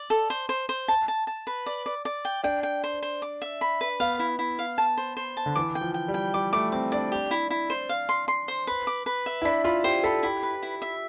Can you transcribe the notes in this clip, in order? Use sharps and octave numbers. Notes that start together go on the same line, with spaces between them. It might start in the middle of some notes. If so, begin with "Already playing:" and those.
Already playing: D5
A4
C5
C5
C5
A5
A5
A5
B4
D5
D5
D5
G5
D4 G5
G5
C5
C5
D6
E5
B5
B4
B3 F5
E4
E4
F5
A5
C5
C5
A5
D3
E3 D6
G5
F3
G5
G3
G5
G3 D6
A3 D6
C4 D6
D4 D5
G4
E4
E4
C5
F5
C6
C6
C5
B4
D6
B4
E5
E4
D4 B5
F4 B5
G4 C5
A4 B5
E4 G4
B4
E4
E5